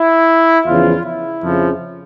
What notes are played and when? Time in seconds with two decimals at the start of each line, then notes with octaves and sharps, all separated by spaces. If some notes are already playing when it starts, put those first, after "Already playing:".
Already playing: E4
0.66 E2 C#3 F3 F4
1.05 E4
1.44 F2 C#3 F3